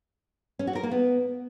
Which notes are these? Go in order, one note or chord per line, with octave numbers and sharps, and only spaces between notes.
C#4
F#4
A#4
A#3
B3